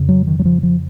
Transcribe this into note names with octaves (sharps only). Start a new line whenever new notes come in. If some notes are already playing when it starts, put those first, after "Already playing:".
Already playing: F2 C#3
F#3
D#3
F#3
F3
F3